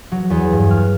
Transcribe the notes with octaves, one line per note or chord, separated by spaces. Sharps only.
F#3
E2
G2
F6